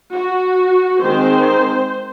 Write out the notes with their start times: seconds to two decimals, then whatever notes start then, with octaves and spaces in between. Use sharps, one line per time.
0.13 F#4
1.01 D#3 G#3 C4 C5